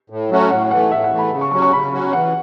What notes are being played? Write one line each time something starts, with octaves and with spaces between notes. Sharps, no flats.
A2
F#3 A3 C#4 F#4
A2 F#5
E3 A3 F#5
A2 E5
F#5
E3 A3
B5
C#3
C#6
F#3 C#4 F#4 C#6
C#6
C#3 B5
F#3 C#4 F#4
E3 F#5